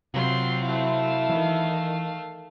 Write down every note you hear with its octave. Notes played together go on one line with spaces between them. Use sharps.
C3 F#3 C4 F4 C6
A3 E4 F5
D#3 E3